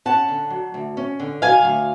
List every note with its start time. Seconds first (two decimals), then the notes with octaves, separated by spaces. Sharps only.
0.05 C#4 F#5 A5
0.28 D3
0.50 F#3
0.74 D2
0.97 C#4
1.20 D3
1.42 F#3 F5 G#5
1.65 D2